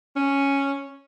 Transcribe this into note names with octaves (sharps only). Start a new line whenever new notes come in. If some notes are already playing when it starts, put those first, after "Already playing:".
C#4